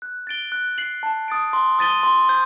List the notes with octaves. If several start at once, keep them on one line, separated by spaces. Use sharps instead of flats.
F#6
A6 D7 G7
F#6
C7 F#7
A5
D#6 A6 D7
C6
D#6 A6 D#7 G7
C6
G6